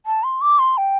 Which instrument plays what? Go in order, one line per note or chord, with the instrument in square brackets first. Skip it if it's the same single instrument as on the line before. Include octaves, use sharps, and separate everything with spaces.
[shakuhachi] A5
C6
D6
C6
G5